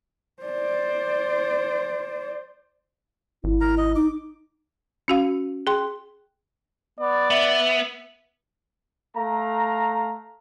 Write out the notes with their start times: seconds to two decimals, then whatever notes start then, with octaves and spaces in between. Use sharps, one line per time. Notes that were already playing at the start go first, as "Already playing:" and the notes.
0.42 C5 D5
3.44 G#1 E4
3.61 A#4 A#5
3.78 D#5
3.96 D#4 D6
5.08 C#4 F#4 F5
5.67 G#4 G5 C6
6.99 B3 D5
7.30 B3 E5
9.16 A3 F5 A#5